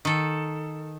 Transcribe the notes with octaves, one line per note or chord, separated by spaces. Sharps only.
D#3 A4